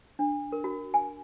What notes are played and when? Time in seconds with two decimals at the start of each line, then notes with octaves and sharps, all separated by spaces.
0.19 D4
0.52 A#4
0.64 F#4
0.94 G#5